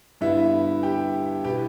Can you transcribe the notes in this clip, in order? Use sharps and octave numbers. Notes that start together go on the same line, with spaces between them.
G2 D3 B3 E4 E5
G4 G5
B2 B3 E4 G4 G5